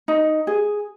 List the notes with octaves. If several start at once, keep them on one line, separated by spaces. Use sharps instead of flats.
D#4
G#4